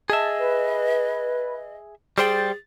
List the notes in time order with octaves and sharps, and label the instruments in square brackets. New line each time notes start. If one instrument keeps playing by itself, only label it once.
[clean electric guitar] G#4 E5 [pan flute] D#5 [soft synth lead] A5
[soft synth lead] B4
[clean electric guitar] G3 C5 G5 [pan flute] G#4 [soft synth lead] A6